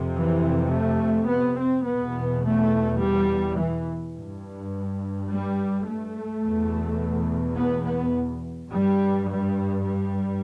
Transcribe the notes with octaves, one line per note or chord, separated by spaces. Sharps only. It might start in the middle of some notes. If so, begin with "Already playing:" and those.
Already playing: F2 C3
E3
A3
B3
C4
E2 B2 B3
A3
G3
E3
G2
G3
A3
E2 B2
B3
B3
G2 G3
G3
G3